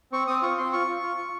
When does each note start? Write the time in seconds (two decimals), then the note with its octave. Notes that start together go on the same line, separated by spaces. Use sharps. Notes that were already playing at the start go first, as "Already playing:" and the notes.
0.12 C4 C#6
0.27 C4 D#6
0.42 F4 C#6
0.58 C4 C6
0.73 F4 C#6
0.87 F4
1.02 F4
1.17 F4